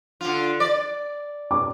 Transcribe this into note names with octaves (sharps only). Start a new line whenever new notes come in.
D3 F4
D5
D6